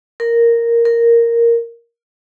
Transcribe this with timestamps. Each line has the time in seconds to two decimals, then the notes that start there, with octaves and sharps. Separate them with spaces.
0.20 A#4
0.85 A#4